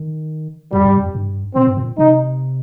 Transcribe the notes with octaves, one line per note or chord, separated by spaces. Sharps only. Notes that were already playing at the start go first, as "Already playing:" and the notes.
Already playing: D#3
F2 G3
G2
F2
G2
A#2 C4
G2
A#2
C3 D#4